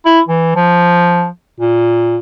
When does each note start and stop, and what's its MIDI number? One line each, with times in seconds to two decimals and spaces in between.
0.05 0.20 64
0.28 0.52 52
0.55 1.27 53
1.60 2.18 46